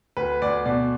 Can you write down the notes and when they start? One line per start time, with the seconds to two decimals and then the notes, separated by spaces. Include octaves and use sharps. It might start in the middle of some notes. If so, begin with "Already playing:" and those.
0.17 D2 B4
0.42 D2 D5
0.65 B2 D5